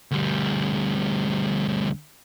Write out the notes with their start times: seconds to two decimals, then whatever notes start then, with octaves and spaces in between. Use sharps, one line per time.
0.11 D2 G3